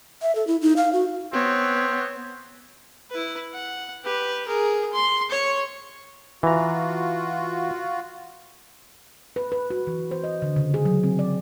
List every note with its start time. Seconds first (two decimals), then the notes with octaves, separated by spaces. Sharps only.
0.22 E5
0.35 A4
0.47 E4
0.62 D#4
0.77 F5
0.93 F#4
1.33 B3 C4 C#5
3.11 E4 B4
3.53 F#5
4.04 G4 B4
4.47 G#4 A#4
4.92 C6
5.30 C#5 C#6
6.43 E3 F4 F#4 A#5
9.36 B4
9.52 B4
9.70 F#4
9.87 E3
10.11 C5
10.24 D#5
10.42 D3
10.56 C#3
10.74 G#4
10.85 F#3
11.03 C4
11.19 D5